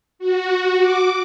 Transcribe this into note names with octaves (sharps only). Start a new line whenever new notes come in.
F#4
D6